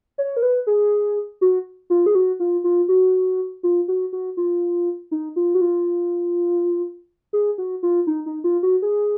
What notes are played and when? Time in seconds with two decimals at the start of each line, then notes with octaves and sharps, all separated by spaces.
0.18 C#5
0.37 A#4
0.42 B4
0.67 G#4
1.41 F#4
1.90 F4
2.06 G#4
2.15 F#4
2.40 F4
2.64 F4
2.89 F#4
3.63 F4
3.88 F#4
4.13 F#4
4.37 F4
5.11 D#4
5.36 F4
5.55 F#4
5.61 F4
7.33 G#4
7.58 F#4
7.83 F4
8.07 D#4
8.26 D#4
8.44 F4
8.63 F#4
8.82 G#4